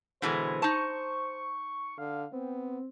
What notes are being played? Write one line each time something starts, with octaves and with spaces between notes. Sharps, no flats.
B2 D3 E3 G#3 C5
D#4 A5 C#6
D3 F5
B3 C4